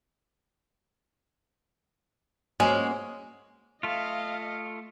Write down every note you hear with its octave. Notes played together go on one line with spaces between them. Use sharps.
G#3 A#3 C#4 F#4
A3 F4 D#5 F5